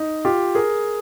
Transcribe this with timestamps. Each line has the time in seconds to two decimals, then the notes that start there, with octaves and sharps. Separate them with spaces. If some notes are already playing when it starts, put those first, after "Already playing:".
Already playing: D#4
0.25 F4 G4
0.55 G#4 A#4